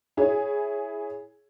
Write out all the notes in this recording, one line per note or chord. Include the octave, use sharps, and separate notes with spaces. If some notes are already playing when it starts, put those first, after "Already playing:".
E4 G#4 C#5